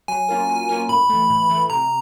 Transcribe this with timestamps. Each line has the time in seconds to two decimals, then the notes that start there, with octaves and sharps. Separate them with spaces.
0.08 F#3 G#5
0.29 A#3 C#4 F4 A#4
0.49 F#3
0.69 A#3 C#4 F4 A#4
0.89 A2 B5
1.10 E3 A3
1.30 A2
1.50 E3 A3
1.70 C3 A#5